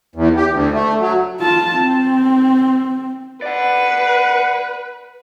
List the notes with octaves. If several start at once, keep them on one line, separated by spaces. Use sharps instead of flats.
E2
G4
D2
A3
F#3
F4 A5
C4
B4 D5 F#5